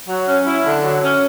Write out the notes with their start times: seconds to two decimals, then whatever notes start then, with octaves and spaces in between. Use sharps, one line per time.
0.08 F#3
0.27 C#4
0.46 E4
0.65 D3
0.83 F#3
1.02 C#4